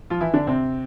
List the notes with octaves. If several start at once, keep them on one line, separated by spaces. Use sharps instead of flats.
F3 F4
E3 E4
D3 D4
C3 C4